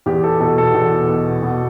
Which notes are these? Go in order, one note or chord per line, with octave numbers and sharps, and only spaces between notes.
E2 G4
A4
B2 A4
A4
E2
B2
B2